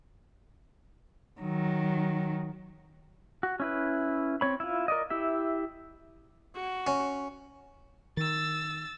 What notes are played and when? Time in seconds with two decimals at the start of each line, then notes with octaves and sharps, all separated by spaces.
1.41 D#3 F#3
3.43 F#4
3.60 C#4 E4 B4
4.41 C4 C#5 B5
4.60 E4 F4
4.88 A#4 D5 D#5
5.10 E4 G4 E5
6.55 F#4
6.87 C#4
8.17 D#3 E6 A6